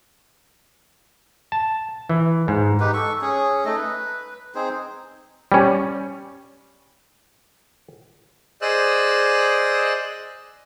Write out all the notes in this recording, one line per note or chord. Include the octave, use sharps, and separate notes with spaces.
A5
E3
G#2
D#4 G4 B4
A4 C#6
C#4 G#4
A3 D#4 A4 D#5
B4
C4 D#4 G#4 C5
G3 C#4
G#4 C5 D5 D#5 E6 F#6